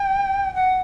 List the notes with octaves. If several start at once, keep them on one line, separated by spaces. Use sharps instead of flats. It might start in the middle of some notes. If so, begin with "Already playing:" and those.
Already playing: G5
F#5